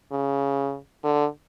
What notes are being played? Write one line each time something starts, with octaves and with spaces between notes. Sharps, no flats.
C#3
D3